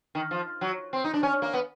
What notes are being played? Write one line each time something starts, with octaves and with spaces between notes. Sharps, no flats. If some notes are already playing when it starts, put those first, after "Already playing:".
D#3
F3
F#3
C4
D#4
D4
C#4
A#3
B3